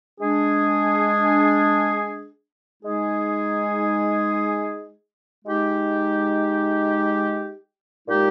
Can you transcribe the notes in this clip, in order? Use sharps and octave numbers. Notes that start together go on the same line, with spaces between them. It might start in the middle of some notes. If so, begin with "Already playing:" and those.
G#3 D4 G#4
G#3 D#4 G#4
G#3 D#4 G4
A#2 G#3 D#4 G4